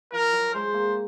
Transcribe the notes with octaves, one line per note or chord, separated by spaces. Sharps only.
F3 A#4
F#3
G#3 C5
A#3